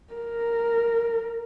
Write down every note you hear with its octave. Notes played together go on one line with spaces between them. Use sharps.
A#4